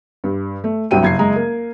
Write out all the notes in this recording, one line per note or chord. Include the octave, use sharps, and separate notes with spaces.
G2
A3
C2 G2 F#3 G5 D#7
F#1 G#6 C7
F#1 G#3 A#5
A#3